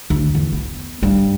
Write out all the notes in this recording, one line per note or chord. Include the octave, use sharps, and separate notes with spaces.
D2
E2
B3
G2